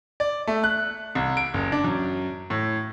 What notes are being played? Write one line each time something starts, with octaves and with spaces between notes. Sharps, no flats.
D5
A3
F#6
C2
D7
F#1
D4
F#2
A2